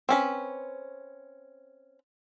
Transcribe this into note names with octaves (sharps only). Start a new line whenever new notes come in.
C4 C#4 B4